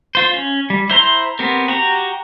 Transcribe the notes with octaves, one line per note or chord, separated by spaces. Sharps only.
F4 C5
C#4
G3
E4 C5 A#5 C6
B3 C4 G4 A#4
F#4 G4 A#5